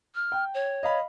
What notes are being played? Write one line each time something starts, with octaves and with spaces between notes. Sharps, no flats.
F6
G5
C#5
D#5 F5 B5